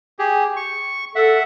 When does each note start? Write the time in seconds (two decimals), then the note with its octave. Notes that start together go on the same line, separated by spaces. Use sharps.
0.19 G4 G#4
0.56 C#6
1.15 A4 E5 F#5